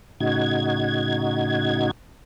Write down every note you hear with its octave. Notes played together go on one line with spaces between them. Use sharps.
A2 C#3 D#4 F#4 G#6